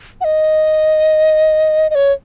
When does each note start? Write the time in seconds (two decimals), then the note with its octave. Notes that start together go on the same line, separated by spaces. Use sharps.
0.21 F#5
0.24 D#5
1.90 D#5
1.95 C#5